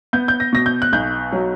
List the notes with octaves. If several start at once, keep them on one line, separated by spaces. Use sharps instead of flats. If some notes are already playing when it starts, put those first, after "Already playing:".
B3 G6
G6
A#6
B2 A#6
G6
F#6
B1 G6
F#3